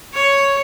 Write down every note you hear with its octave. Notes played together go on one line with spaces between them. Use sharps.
C#5